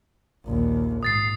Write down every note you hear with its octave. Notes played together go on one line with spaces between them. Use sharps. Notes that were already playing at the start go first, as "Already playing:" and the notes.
A#1 D#2
G#2 D#6 A6 C7